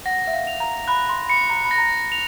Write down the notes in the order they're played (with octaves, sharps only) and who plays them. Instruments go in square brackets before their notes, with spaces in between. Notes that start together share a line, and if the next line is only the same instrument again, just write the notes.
[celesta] F#5 [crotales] A#6
[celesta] E5
F5
[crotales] F7
[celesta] A#5
[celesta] B5 [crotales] F#6
[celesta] C6
[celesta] B5 [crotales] C#7
[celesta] A#5
B5
[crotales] A#6
[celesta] A#5
[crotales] F7